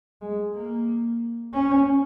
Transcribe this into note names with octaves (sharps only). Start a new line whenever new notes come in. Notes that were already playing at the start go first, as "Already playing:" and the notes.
G#3
A#3
C#4